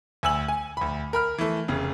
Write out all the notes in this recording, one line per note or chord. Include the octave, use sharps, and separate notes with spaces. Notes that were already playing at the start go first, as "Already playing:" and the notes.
D2 G#5 E6 F#7
G#5
D2 B5
A#4 B5 F6
E3 A3
F1 C#3